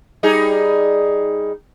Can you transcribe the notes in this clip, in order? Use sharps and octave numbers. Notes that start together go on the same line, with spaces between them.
G3 D#4 G#4